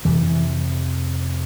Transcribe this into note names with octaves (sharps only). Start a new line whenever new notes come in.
F2 C3 E3